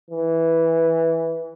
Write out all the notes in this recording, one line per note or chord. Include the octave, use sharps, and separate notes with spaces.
E3